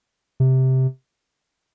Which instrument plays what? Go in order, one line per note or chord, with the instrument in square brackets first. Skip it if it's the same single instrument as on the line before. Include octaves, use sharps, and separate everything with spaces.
[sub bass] C3